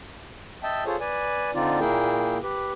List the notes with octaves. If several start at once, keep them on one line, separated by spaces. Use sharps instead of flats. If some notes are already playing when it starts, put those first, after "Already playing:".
D#5 E5 G5 A5
F4 G#4 A4 C5 C#5
B4 D5 G#5
D3 C4 D#4 F4 D5
A#2 A#3 E4 G#4 A#4 G5
G4 B4